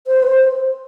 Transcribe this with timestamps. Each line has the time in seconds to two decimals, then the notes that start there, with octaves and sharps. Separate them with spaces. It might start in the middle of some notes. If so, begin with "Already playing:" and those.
0.07 C5
0.23 B4
0.27 C5